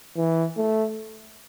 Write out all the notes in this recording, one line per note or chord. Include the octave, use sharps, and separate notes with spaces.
E3
A3